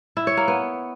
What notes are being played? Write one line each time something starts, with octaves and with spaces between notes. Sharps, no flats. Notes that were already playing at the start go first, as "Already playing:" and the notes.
E4
C#5
A#3
B3